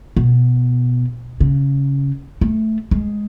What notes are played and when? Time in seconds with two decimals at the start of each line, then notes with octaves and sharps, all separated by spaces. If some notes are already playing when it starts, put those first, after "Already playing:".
0.16 B2
1.40 C#3
2.41 A3
2.91 G#3